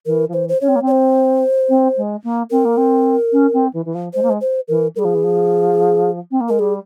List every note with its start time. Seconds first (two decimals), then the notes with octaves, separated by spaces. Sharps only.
0.05 E3 A#4
0.28 F3
0.33 E3 C5
0.49 C5
0.61 C#4 C#5
0.68 C4
0.75 A#3
0.81 C4
0.87 C#5
0.91 C5
1.69 C4
1.97 G#3
2.23 A#3
2.51 C4 A#4
2.65 A#3
2.77 C4
3.32 C#4
3.53 C4
3.73 E3
3.85 E3
3.94 F3
4.13 G#3 C5
4.22 A#3
4.29 G#3
4.41 C5
4.68 E3 A#4
4.95 G3 A#4
4.99 G#4
5.04 F3
5.14 E3
5.23 F3
6.31 C4
6.40 A#3
6.49 G#3 A#4
6.59 G3 G#4